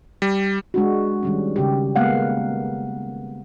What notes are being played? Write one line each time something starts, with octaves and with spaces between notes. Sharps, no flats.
G3
G#3 D4 F#4
D#3 G3 C#4
C#3 G4
G#3 A#3 B3 F5 F#5